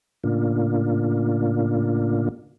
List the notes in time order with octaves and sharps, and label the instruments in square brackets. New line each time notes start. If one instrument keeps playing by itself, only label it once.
[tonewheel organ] A2 C#3 A#3 D4 F4